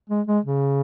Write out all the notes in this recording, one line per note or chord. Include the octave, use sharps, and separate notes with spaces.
G#3
G#3
C#3